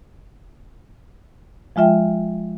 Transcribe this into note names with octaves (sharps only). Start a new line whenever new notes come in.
F3 G#3 F4 E5 G5